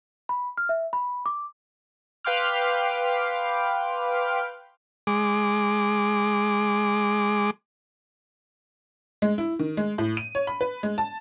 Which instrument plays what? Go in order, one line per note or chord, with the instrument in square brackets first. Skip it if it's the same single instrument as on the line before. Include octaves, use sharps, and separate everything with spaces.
[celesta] B5
F6
E5
B5
D6
[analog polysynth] B4 F5 G5 C6 D6 F6
[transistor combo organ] G#3 D6
[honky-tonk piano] G#3
E4
D#3
G#3
A2
D#7
C#5
B5
B4
G#3
A5